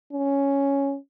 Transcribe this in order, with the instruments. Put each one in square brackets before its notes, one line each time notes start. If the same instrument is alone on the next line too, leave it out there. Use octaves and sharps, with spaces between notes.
[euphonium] C#4